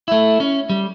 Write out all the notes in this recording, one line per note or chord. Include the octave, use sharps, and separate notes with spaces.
A3 E4
C#4
G3